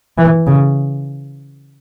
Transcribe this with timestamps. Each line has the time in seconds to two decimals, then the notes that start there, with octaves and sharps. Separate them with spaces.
0.18 E3
0.47 C#3